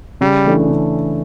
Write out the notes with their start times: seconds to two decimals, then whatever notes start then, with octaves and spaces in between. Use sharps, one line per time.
0.21 C#3 G3
0.45 E3 A3 D4
0.69 C#3